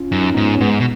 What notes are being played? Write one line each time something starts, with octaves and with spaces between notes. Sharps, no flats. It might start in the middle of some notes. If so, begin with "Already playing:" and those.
Already playing: C#4 F4
F#2 D#4
C#4
G#2 B3 D#4
C#4
G#2 G#3 B3
B2